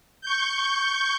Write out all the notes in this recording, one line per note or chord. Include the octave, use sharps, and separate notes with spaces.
C#6 G6